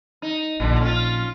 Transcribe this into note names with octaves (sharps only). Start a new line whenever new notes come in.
D#4
A#1 A#2 D3
C#4 F4